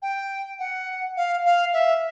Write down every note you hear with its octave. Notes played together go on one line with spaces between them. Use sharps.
G5
F#5
F5
F5
E5